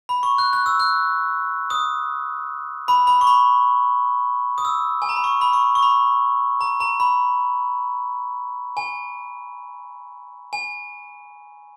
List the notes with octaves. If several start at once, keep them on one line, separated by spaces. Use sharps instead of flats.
B5
C#6
F#6
F#6
E6
F#6
D#6
B5
B5
C#6
B5
D#6
E6
G#5
A#5
B5
C#6
B5
C#6
C#6
B5
A#5
A#5
B5
G#5
G#5